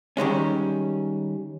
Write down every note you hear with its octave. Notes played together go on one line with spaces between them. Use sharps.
D#3 G3 G#3 C#4